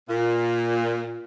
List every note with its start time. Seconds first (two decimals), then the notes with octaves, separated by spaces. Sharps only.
0.09 A#2